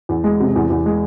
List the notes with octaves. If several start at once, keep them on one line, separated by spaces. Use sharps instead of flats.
E2
G#3
C3
E2
E2
G#3